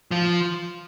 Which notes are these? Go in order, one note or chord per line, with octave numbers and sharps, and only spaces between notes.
F3